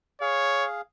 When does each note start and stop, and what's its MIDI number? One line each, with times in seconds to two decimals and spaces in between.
0.21 0.81 68
0.21 0.66 73
0.21 0.81 77